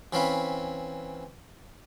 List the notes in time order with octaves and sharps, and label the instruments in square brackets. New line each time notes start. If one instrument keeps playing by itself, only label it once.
[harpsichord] E3 C4 C#4 F5 B5